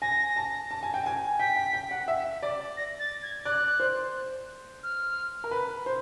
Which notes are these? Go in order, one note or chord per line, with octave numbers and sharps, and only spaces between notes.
G#5 A#6
A5
A5
G#5
G5
G#5
G5 B6
G5
G5
F#5
E5
D5
A#6
A6
G#6
D5 F#6
C5
F6
A#4
B4
C5